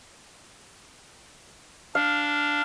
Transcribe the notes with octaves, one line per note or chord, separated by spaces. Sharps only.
D4 F5